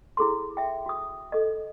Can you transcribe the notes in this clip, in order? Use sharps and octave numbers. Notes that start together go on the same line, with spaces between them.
E4 G#4 A4 C6
E5 G5
F#4 D#6
A4 D#5